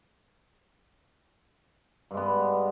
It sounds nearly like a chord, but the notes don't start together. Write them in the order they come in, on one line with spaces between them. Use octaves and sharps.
G2 G#3 B3